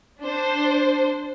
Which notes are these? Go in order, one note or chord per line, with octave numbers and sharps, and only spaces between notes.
D4 C5